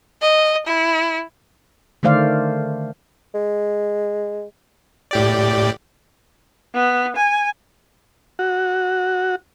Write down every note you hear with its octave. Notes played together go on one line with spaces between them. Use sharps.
D#5
E4
D3 D#3 A3 C5 D5 F5
G#3
A2 G4 D5
B3
G#5
F#4